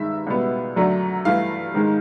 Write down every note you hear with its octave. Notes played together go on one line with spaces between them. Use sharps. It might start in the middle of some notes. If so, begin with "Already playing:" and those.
Already playing: G2 D#3 G#3 E5
C#2 B2 G3 B3
F#2 D3 F#3 A3 D4
G2 E3 A3 F5
G#2 D#3 G#3